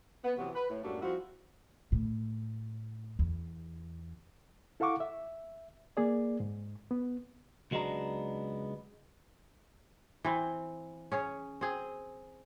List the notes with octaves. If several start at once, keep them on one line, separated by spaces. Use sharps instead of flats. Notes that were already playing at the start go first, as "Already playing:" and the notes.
B3
C3 E3 F#3 B3
B4
A2
F#2 A2 F#3 G3 A#3 D4
F3 G3 C4 E4 F#4
A2
E2
E4 A4 F5 F#5 C#6 D6
E5
A#3 G#4 D5
G#2
B3
C#2 F#3 G#3 B3 D4 A#5
E3 C4
C#4 G#4 C#5
C4 G#4